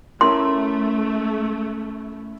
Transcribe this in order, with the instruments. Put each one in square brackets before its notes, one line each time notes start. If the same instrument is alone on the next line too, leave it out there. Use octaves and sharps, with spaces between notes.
[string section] A3 [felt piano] C#4 E4 A#4 [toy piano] C6